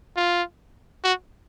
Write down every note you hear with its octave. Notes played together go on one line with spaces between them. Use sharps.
F4
F#4